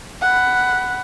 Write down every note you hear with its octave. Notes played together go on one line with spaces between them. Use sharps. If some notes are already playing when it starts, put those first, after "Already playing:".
F#5 B5